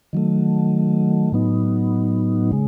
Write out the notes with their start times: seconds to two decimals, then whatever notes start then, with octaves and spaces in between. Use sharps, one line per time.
0.13 D#3 F#3 A3
1.32 A2 F#3 B3 D#4
2.52 C#3 G#3